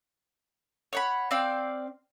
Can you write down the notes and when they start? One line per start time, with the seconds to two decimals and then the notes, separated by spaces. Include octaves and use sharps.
0.93 C#5 F#5 B5
1.31 C4 D5 F5 G5